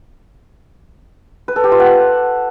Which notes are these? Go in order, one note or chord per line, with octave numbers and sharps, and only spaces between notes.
B4
A4
G4
F4
F#5